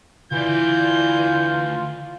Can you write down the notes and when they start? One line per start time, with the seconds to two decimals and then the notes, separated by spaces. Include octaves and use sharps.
0.32 D2 E3 F4 D5 G6